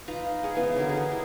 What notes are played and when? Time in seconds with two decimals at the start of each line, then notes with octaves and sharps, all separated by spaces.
0.08 D#4 F4 B4 A#5
0.43 G#3 G#4 F#5
0.55 C#3 E3 B3 C#4
0.77 D3 F#3 B3 A#4
0.89 E4 G#4
1.09 G3 E4